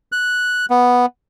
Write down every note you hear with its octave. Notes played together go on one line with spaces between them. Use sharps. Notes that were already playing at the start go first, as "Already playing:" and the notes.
F#6
B3